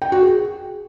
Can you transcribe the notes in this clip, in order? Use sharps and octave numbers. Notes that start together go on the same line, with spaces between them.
G5
F#4
G#4